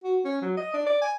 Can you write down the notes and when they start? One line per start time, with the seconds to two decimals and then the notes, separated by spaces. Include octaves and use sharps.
0.04 F#4
0.25 C#4
0.42 F#3
0.57 D#5
0.73 D4
0.86 D5
1.02 G#5